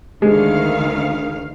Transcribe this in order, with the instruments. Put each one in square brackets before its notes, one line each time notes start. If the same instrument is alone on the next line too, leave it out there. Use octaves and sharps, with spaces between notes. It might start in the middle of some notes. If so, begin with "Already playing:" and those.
[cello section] D2 D#3 F5 [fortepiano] G#3